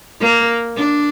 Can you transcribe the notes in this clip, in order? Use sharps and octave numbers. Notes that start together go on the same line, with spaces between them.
A#3
D4